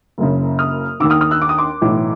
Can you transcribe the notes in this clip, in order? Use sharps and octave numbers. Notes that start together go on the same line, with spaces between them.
F#1 F#2 C#3
D#6 F6
D#2 D#3 D6 E6
D#6 F6
D#6 F6
E6 F#6
D6
D#6
C6 D6
B1 A2 E3